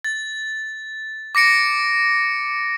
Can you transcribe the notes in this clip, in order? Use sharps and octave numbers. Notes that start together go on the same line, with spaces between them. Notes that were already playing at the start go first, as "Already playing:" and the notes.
A6
D6 A#6 C#7 D7